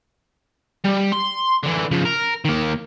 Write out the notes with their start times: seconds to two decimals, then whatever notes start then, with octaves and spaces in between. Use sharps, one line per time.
0.84 G3
1.12 C6
1.63 D3 E3
1.91 C#3 F3
2.05 A#4
2.45 D#3 A#3